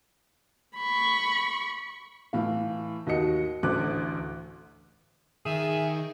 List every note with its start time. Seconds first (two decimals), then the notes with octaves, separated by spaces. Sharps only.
0.78 B5 C#6
2.33 A2 E3 F5
3.07 D#2 F#4 D#5 C#7
3.63 A1 D2 D6 F#6
5.46 D#3 G#4 E5